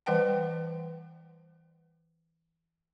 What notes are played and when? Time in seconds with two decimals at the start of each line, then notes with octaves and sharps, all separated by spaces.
0.06 E3 G3 B4 F#5 G5 A5